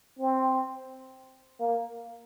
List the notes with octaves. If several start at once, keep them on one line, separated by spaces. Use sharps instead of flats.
C4
A#3